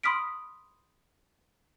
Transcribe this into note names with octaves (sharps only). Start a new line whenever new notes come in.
B5 C6 D#6 F6 B6 D7